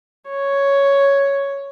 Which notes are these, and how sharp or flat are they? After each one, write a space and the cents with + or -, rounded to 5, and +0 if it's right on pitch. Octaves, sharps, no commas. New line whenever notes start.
C#5 +5